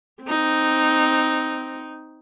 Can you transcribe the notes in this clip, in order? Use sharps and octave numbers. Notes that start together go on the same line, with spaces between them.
C4 D#4